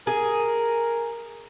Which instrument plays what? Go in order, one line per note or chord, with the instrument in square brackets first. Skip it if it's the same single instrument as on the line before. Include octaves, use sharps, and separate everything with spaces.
[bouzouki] G#4 [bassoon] A#4